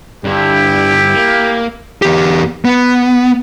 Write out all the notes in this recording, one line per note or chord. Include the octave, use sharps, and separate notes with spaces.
G2 D3 E4 G4
A#3
E2 G4
B3